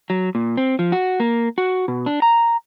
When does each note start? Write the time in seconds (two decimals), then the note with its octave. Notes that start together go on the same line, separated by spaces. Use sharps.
0.10 F#3
0.35 A#2
0.57 C4
0.79 F3
0.92 F#4
1.20 A#3
1.58 F#4
1.88 B2
2.06 D4
2.22 A#5